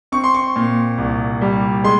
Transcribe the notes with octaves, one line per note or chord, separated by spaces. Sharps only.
C4 C#6
C6
C#6
A#2
C2
G3
G#3 C6